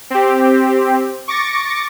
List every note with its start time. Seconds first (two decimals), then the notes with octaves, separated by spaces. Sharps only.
0.10 C4 G4
1.28 C#6 D6 A6 A#6 C#7